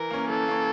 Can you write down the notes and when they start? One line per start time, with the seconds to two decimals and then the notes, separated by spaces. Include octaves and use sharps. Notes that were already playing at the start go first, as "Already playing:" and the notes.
Already playing: E3 A#4
0.10 A#3 C#4
0.29 E3 A4
0.48 A#3 C#4